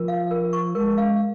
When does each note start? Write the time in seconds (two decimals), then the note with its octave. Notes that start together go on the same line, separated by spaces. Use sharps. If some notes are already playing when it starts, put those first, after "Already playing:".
Already playing: F3 A#4
0.08 F5
0.31 A#4
0.53 C#6
0.75 G#3 A#4
0.98 F5